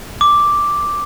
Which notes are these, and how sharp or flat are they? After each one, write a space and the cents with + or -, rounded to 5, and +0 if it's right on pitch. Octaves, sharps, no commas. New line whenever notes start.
D6 +0